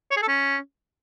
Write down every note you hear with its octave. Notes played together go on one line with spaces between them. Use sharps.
C#5
G#4
A4
C#4